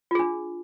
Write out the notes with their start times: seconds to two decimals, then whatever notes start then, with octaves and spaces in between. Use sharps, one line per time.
0.11 F4
0.15 G#4
0.19 D4